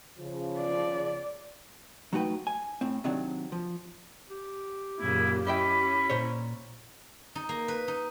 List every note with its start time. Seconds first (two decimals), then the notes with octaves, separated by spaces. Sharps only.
0.18 C#3 F3
0.60 D5
2.13 F#3 A3 D#4 F#4 B4 G5
2.47 G#5
2.81 A2 C4
3.04 C3 D#3 F#3 C4 D4
3.52 F3
4.30 G4
5.00 F#2 A#2 C#3 E4
5.47 C#4 E4 D#5 E5 G5 B5
6.10 A#2 C5 C#5
7.35 D#4
7.49 A#3
7.68 B4
7.88 D#4